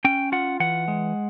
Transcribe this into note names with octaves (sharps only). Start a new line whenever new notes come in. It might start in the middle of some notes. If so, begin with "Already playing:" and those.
C#4 G5
F4 F#5
E3 F#5
G#3